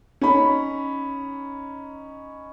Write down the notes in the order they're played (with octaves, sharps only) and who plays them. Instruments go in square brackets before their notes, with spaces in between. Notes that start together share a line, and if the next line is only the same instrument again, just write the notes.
[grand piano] C#4 D#4 B5